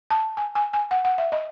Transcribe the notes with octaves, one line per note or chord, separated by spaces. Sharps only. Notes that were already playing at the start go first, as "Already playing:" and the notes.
A5
G#5
G#5
G#5
F#5
F#5
E5
D#5